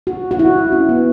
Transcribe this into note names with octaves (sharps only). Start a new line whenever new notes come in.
F#4
F#4
E4
C#4
B3